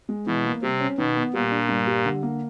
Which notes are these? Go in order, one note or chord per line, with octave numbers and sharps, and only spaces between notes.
G#3
B2 E3
A#3
C3 G3
C#4
B2 D#3
B3
A#2 G3
D4
G2
G3
D3
A#3